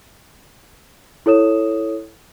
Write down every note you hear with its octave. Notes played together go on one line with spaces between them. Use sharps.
E4 A4 C#5 D#6 E7